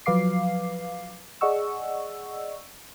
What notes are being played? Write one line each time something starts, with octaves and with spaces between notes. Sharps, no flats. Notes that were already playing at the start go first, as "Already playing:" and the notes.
F3 F#3 B4 F5 D6 C7
G#4 D5 D#5 F#5 C#6 E6